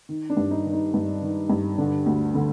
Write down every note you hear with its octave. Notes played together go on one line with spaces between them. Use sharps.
D#3
D4
G2
D#4
D#3
D#4
G2
D#3
G2
D3 D4
D2
D3